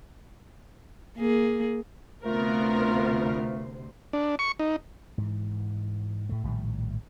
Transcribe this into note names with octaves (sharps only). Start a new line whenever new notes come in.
A#3 G#4
D2 C3 A3 B3 F4 A#4 C5
D4
C#6
D#4
G#2 E3
A2 A3
A#1 A2 D#3 G3